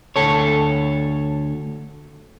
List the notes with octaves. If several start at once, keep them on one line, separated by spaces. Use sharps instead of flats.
D2 A4 C#5